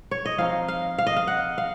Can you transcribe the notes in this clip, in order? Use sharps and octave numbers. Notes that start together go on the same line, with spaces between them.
C#5
D#5
F3 C4 D#4 F5
F5
F5
D#5
F5
F#5
F5